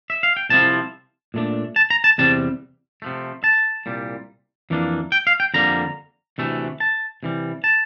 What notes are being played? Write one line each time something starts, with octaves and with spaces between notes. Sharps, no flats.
E5
F5
G5
C2 C3 F3 C4 E4 A5
A#2 A3 D4
A5
A#5
A5
E2 C3 G3 C4 A5
C3 F3 A3
A5
C2 A#2 G3
F2 E3 A#3 D4
G5
F5
G5
F2 D3 G3 A#3 A#5
D2 C3 E3 A3
A5
C3 E3 G3
A5